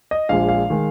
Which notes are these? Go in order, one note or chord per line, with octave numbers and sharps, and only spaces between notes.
D#5
A#1 A#2 G#3 F5
F5
D#3 G#3